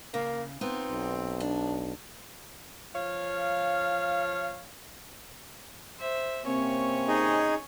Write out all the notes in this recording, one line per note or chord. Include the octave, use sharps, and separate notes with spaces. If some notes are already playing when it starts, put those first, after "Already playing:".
C#3 A#3
B3 C4 D#4 F4
B1
D4
F3 C#5 F5
C5 E5
C3 A#3 C4 C#4 C#5
D#4 G#4 D#5